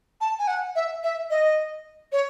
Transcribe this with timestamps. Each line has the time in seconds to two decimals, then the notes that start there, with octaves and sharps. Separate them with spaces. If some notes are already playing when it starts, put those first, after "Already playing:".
0.21 A5
0.39 G#5
0.48 F#5
0.76 E5
1.03 E5
1.30 D#5
2.12 C#5